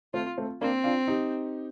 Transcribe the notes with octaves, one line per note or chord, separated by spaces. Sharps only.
A3 C4 F4
A3 C4
A#3 C4 D4
D4 F4
D#4 G4